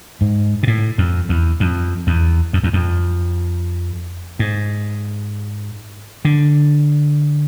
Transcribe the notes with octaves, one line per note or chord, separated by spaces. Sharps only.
G#2
B2
A2
F2
E2
F2
E2
F2
E2
F2
G#2
D3